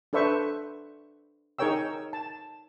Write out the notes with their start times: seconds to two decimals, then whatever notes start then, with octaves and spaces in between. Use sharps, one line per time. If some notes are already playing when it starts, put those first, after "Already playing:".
0.13 D4 A4 B4 C5 E5 C#6
1.59 D#4 G#4 A#4 C#5 G5 E6
2.13 A5